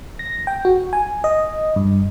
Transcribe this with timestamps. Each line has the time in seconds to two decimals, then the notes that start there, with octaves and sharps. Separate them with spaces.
0.19 A#6
0.47 G5
0.65 F#4
0.93 G#5
1.24 D#5
1.76 G2